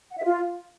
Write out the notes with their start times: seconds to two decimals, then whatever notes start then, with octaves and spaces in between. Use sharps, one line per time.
0.10 F#5
0.17 E5
0.24 F4